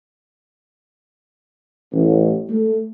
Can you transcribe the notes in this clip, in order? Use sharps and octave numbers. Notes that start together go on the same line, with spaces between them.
A1
A3